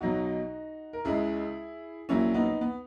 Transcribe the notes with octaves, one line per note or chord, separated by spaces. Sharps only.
B1 B2 F#3 D#4 F#4
A#4
C#2 C#3 G#3 E4 G#4
A#1 A#2 F#3 C#4 E4
B3 D#4
B3